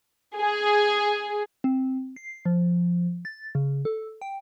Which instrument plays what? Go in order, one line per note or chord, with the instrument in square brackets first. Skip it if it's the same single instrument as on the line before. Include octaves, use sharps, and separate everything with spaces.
[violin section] G#4
[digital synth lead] C4
C7
F3
A6
C#3
A4
G5